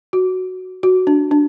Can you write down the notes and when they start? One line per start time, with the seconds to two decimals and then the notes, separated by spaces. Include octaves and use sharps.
0.13 F#4
0.83 F#4
1.07 D4
1.31 D4